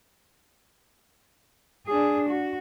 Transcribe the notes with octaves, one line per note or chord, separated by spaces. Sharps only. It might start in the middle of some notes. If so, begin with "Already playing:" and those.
D4 G#4
F#4